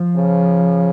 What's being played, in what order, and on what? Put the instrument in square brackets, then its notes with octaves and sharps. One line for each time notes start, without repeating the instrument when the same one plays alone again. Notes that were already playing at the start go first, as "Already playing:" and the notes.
Already playing: [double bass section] F3
[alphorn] C#3